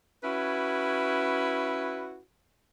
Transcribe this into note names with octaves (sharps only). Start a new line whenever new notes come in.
C#4 E4 F#4 B4